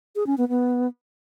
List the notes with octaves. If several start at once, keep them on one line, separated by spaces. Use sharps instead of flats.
G#4
C#4
B3
B3